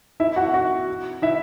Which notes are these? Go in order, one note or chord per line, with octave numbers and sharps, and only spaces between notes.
E4 E5
F#4 F#5
F#4 F#5
E4 E5